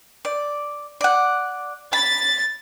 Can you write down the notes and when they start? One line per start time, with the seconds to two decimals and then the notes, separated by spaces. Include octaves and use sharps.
0.25 D5
1.01 D5 F#5
1.93 B5 A6